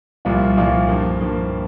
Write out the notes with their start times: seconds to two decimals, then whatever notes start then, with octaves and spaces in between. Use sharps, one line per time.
0.25 C2 A#2 F3 A#3 F4
0.56 C2 A#2 F3 A#3 F4
0.88 G2 F3 A#3
1.20 G2 F3 A#3